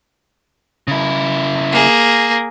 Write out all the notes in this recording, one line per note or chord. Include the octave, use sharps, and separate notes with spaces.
C#3 E4
A#3 G#4